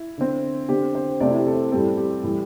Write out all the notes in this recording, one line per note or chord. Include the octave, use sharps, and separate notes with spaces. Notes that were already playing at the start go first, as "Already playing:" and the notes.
Already playing: E4
D3 C4
D3 C4 G4
C5
C3 A3 C4 D5
E4
G4
A4
C5
A2 G3 C4 A4
G4
A2 E3 G3